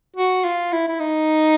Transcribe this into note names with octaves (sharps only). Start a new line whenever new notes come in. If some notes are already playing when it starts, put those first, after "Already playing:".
F#4
F4
E4
E4
D#4